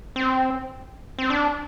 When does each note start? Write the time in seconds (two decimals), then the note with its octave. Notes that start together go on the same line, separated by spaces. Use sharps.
0.16 C4
1.19 C4
1.30 D4